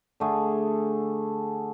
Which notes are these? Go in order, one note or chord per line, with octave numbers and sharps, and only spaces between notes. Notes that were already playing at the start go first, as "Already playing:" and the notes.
D3 A3 G#4